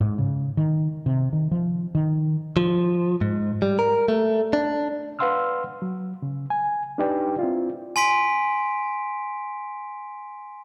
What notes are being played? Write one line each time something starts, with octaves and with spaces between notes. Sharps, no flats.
G#2
C#3
D#3
C3
D#3
F3
D#3
F3
G#2
G3
A#4
A3
D4
B4 F5 F#5 C6 E6 F6
F#3
C#3
G#5
D4 D#4 G4 B4 D5 G5
C4 E4 F4
G#5 C6 B6 D7